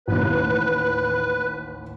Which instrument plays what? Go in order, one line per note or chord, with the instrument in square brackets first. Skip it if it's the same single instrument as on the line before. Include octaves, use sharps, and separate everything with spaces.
[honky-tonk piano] A1 D#2 [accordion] B4